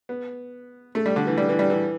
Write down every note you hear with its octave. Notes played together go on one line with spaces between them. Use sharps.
B3
A3
G3
D3
E3
G3
E3
G3
E3